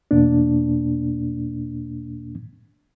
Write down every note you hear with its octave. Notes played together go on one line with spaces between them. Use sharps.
E2 B2 A#3 D4